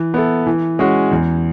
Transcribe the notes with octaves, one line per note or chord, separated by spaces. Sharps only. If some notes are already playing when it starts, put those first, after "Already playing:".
Already playing: E3
B3 E4 A4
E3
G#3 C#4 F#4
E2